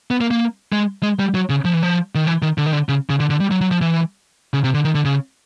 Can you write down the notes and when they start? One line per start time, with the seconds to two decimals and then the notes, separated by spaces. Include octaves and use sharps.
0.11 B3
0.21 A#3
0.31 A#3
0.72 G#3
1.03 G#3
1.19 G3
1.35 F#3
1.50 C#3
1.65 F3
1.74 E3
1.83 F3
2.15 D#3
2.27 E3
2.42 D#3
2.58 D3
2.66 D#3
2.73 D3
2.89 C#3
3.10 C#3
3.20 D3
3.30 D3
3.40 G3
3.51 F#3
3.61 F#3
3.71 F3
3.81 E3
4.54 C#3
4.64 C3
4.74 D3
4.85 D#3
4.95 D3
5.05 C#3